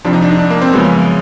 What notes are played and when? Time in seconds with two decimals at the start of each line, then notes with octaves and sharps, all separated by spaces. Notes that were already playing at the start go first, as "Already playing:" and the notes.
0.05 F2 C3 F3 D4
0.13 D#4
0.22 D4
0.31 D#4
0.39 D4
0.50 A#3
0.62 C4
0.73 F#2 C#3 F3 G#3 B3